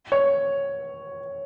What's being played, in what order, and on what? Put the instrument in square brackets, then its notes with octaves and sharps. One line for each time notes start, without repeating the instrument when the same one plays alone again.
[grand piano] C#5